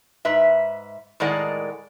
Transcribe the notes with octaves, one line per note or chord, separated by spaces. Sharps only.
G#2 B4 E5
A2 D#3 G#3 A#4 D5 F#5